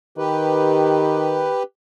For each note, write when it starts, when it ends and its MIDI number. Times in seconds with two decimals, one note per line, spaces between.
0.18 1.52 51
0.18 1.63 67
0.18 1.63 71